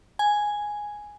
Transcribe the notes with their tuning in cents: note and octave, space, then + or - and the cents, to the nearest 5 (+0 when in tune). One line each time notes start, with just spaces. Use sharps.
G#5 +0